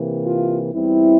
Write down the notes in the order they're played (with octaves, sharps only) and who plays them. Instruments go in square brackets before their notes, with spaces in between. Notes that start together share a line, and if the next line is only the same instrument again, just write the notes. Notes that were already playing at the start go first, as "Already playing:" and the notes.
Already playing: [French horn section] C3 E3 A#3
F4
E2 E3 G3 C4 E4